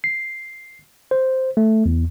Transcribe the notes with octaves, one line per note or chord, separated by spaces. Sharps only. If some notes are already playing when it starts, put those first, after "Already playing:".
C7
C5
A3
E2